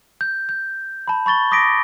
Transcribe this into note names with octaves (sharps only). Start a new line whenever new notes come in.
G6
G6
A5 B5
B5 C#6 A6 G7
D6 D#6 A#6 B6 D7